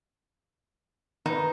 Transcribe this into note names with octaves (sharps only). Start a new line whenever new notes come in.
D#3 D#4 B4